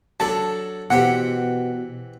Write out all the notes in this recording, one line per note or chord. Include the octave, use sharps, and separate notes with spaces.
F#3 D4 A4 A5
B2 E3 C4 G4 F#5